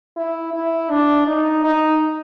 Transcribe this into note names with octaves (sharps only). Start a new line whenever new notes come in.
E4
E4
D4
D#4
D#4